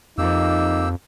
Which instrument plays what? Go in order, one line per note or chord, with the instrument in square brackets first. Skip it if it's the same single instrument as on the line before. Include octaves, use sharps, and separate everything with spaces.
[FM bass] F2 [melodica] A#3 G4 E6 [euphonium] D#4